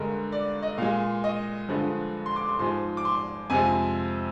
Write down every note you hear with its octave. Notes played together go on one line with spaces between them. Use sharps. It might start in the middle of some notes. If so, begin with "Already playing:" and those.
Already playing: G2 D3 G#3 A#4
D5
D#5
A#2 G#3 F5
D#5
G2 D3 F3 G#3
C6
D6
C6
G#2 F3 G#3 C6
D6
C6
F2 C3 F3 G#3 G#5